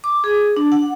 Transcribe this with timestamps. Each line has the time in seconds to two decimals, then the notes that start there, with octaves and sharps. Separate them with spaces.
0.04 D6
0.24 G#4
0.57 D4
0.72 F#5